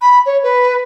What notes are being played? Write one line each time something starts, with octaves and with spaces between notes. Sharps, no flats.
B5
C#5
B4